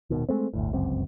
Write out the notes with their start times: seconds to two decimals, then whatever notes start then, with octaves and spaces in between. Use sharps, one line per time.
0.10 D#1 G#1 B2 D#3
0.29 G#3 A3 C4
0.54 G1 D2 A2
0.73 G1 C#2 F#2 C4